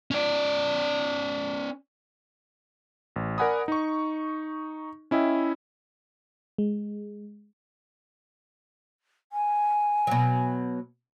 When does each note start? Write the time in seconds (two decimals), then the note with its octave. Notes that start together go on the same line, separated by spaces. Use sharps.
0.11 C#4 D5
3.16 A1
3.38 A#4 D5 F#5 G#5 B5 D#6
3.68 D#4 C#6
5.11 C#4 E4 D#5 E5 G5
6.58 G#3
9.32 G#5
10.07 B2 F#3